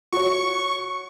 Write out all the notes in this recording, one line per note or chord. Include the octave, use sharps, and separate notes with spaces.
F#4 C#5 C#6